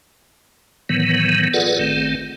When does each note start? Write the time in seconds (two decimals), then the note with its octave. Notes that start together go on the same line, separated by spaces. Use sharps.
0.89 A2 D#3 E3 F#3 B3
1.54 F4 G#4 A4 B4 D5 F#5
1.79 G#1 D#3 A3 C4